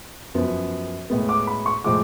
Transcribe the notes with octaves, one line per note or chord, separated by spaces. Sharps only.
F#2 F3 B3
A2 G#3 B3
D6
B5
C#6
A2 F3 G#3 D6